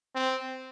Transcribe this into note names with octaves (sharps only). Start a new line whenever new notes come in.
C4